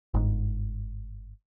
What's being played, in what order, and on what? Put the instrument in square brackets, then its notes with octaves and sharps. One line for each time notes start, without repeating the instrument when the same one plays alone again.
[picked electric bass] G1 G#2